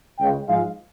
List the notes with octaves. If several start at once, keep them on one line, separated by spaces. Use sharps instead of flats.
C#2 C#3 G#3 G5
G#2 F3 G#3 F5